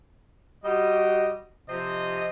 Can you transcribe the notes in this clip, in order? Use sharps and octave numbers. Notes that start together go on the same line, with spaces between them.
G3 F#4 D#5
C3 F3 C5 D#5